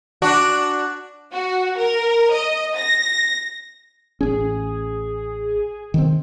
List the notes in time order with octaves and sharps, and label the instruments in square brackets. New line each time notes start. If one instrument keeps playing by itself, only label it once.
[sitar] D4 F#4
[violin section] F#4
A#4
D#5
A#6
[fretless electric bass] A1 C#4 [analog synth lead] G#4
[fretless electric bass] D#3 C4